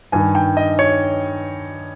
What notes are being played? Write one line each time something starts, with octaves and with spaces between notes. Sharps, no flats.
G2 D#3 G#5
G5
D#5
C#5